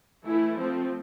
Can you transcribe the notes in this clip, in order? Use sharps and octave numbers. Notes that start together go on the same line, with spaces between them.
E3 A3 E4
F3 A3 C4